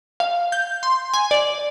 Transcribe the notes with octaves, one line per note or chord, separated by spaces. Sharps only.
F5
G6
C6
G#5
D5